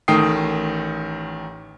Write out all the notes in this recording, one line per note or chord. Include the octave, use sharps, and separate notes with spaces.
A1 D#3 A3 G5 D#6 C7